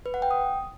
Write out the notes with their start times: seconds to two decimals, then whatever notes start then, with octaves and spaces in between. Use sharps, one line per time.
0.06 B4
0.14 F#5
0.22 G5
0.31 D#6